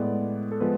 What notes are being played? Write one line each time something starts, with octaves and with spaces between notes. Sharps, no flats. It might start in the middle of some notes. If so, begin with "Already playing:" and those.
Already playing: A2 G#3 B3 D5
A4
F3 G#3 B3 B4